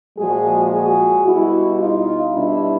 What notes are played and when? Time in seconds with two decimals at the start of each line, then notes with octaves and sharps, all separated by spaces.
0.18 A#2 F3 G#3 F#4 G#4
0.72 F#4 G#4
1.25 B2 G3 E4 F#4
1.79 D#4 F4
2.33 B2 G3 D4 E4